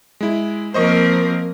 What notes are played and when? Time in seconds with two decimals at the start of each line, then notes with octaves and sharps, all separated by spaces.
0.21 G#3 E4
0.74 F3 A#3 C4 A#4 C5 D#5 C#6